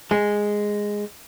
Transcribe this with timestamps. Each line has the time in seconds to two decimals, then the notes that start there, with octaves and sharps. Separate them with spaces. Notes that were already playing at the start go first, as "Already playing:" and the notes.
0.11 G#3